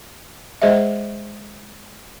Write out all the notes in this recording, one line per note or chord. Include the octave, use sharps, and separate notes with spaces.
G#3 G#4 C5 D#5 E5